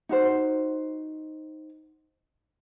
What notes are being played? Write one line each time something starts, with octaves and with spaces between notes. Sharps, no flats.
D#4 F#4 C5